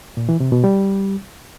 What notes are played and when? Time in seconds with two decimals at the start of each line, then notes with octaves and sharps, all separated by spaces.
0.17 A#2
0.29 E3
0.40 C3
0.52 B2
0.64 G3